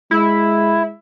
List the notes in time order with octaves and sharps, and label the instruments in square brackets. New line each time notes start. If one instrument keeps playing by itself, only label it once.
[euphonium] G#3 [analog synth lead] E4